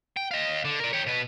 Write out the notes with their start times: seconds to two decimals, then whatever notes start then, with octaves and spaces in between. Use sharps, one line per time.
0.17 G5
0.31 D#5 F5
0.65 D3
0.80 A#4 D5
0.93 G4 C#5
1.06 B2 B4